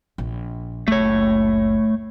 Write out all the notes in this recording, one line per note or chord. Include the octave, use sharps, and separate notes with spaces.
A#1
F#1 C#2 A3 C#5